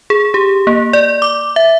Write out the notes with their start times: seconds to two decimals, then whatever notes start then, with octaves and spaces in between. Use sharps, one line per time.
0.10 G#4
0.34 G4
0.67 A#3
0.93 D5
1.22 D6
1.56 E5